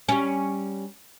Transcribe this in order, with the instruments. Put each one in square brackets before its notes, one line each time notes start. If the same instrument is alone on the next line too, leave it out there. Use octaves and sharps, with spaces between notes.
[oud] G3 C#4